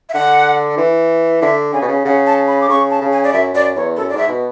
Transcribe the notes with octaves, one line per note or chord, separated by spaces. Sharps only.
E5
D3 F#5
E3
D3 E5
C#3 G#5
B2
C#3
C#3 F#5
A5
B5
D6
C#3 C#6
A5
C#3
G#5
D5
F#2 E5
F#2 D5
E2 C#5
F#2 A4
D5
G#2 E5
B2